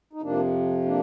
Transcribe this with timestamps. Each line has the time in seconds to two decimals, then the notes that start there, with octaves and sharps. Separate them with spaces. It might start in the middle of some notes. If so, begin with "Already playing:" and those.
0.13 D#4
0.22 F2 C3 F3 A#3 D4
0.85 A#3 D4